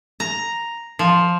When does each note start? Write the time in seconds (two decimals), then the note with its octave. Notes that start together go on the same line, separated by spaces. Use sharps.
0.20 A#5
0.99 F3